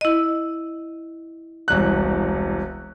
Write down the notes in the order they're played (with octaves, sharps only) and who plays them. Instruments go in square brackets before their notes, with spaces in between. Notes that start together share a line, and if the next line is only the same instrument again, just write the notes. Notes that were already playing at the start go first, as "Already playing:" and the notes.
[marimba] E4 D#5
[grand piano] E1 C2 F#6